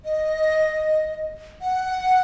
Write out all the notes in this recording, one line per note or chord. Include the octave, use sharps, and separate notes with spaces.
D#5
F#5